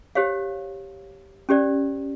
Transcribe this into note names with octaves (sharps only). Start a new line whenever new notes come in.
G4 C5 C#5 F5
C#4 G4 C5 D5